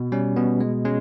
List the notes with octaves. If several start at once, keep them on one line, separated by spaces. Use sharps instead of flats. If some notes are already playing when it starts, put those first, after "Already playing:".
Already playing: B2
G3 C#4
B2 B3
G#3
G#3 C#4